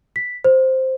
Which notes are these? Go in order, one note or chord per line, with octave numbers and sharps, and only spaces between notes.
B6
C5